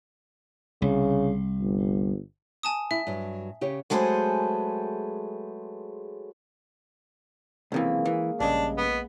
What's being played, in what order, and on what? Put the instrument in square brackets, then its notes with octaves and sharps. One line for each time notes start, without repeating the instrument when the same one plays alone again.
[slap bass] C2 [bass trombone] C#3
[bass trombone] G1
[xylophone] G#5 A5 D#6
[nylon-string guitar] E4 [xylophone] E5
[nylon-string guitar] G2 F#3
C#3 G4 C#5
[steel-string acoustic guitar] F#3 G#3 A3 G#4 B4 C5
[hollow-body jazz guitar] B1 C3 E3 [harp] G#3 A#3 C#4
[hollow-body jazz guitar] E3
[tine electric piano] A#1 D#5 [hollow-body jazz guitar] G2 C#3 [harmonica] D4
[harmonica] B3